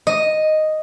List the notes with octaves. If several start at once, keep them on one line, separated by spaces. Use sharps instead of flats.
D#5